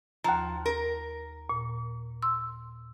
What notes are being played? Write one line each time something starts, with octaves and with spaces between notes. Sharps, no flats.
D#2 F3 A#5
A#4
A#2
C6 E6